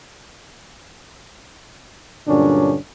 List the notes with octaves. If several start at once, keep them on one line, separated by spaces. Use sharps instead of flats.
G2 A#2 D3 F#3 C#4 D4